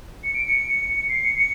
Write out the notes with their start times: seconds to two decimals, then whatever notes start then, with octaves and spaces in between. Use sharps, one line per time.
0.24 C#7
0.34 D7
0.44 C#7
1.09 C7
1.24 C#7
1.39 C#7